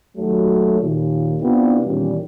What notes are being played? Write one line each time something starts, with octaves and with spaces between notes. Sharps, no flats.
D#2 F#3 A3
D#2 A#2
C3 B3 D4 E4 F4 G4
E2 A#2 D#3 G3 C#4